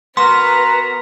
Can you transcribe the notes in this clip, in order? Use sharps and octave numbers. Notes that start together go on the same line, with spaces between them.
B3 F#4 A#4 B4 A#5 C6